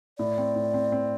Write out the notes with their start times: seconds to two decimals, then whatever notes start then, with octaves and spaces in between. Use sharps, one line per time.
0.19 A2 D5
0.38 C4
0.56 A2
0.74 C4
0.92 C4